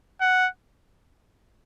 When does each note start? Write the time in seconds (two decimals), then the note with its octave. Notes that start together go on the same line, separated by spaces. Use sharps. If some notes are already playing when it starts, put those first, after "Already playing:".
0.21 F#5